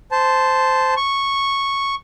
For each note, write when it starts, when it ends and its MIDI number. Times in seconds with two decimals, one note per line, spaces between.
0.11 0.94 72
0.11 0.94 81
0.97 1.95 85